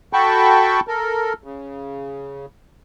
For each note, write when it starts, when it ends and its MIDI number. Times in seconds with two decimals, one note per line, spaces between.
0.13 0.80 66
0.13 0.80 69
0.13 0.80 79
0.13 0.80 81
0.13 0.80 83
0.13 0.80 85
0.88 1.33 69
0.88 1.33 70
1.44 2.46 49